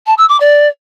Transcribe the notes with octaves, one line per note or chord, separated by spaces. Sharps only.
A5
E6
D6
D5